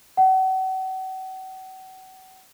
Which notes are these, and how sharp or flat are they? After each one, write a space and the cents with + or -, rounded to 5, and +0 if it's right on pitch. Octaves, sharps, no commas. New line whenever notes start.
F#5 +40